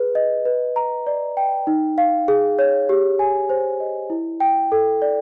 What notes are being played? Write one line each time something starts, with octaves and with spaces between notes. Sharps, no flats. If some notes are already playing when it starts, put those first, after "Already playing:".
Already playing: G#4 B4
D#5
B4
A#5
D5
G5
D#4
F5
G#4
C#5
G4
G#5
C5
D#5
E4
G5
A4
D5